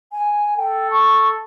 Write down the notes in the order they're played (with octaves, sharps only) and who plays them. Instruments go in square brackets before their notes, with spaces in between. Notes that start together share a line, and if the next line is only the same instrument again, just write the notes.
[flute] G#5
[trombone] A4 [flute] G5
[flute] C#6